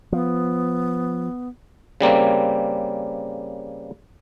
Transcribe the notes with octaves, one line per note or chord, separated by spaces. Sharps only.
F3 B3
C#3 G3 A#3 C4